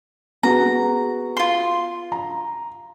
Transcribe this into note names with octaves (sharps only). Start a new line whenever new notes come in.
B3 F#4 G#4 A#5
F4 C6
A#5